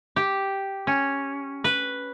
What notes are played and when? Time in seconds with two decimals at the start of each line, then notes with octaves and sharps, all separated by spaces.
0.16 G4
0.87 C#4
1.64 B4